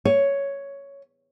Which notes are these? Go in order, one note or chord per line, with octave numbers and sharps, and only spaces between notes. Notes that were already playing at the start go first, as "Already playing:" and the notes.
C#5